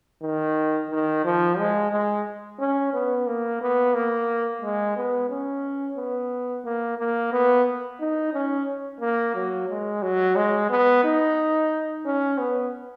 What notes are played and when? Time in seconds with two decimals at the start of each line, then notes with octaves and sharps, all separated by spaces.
0.23 D#3
0.91 D#3
1.25 F3
1.59 G#3
1.91 G#3
2.60 C#4
2.94 B3
3.27 A#3
3.61 B3
3.94 A#3
4.62 G#3
4.96 B3
5.30 C#4
5.97 B3
6.65 A#3
6.98 A#3
7.33 B3
8.00 D#4
8.33 C#4
9.01 A#3
9.35 F#3
9.69 G#3
10.02 F#3
10.36 G#3
10.70 B3
11.04 D#4
12.05 C#4
12.38 B3